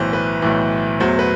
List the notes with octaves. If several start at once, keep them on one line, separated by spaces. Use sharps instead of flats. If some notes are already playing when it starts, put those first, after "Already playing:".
Already playing: B1 A2 E3 C5
B4
B1 A2 E3
E2 B2 F#3 A3 C5
B4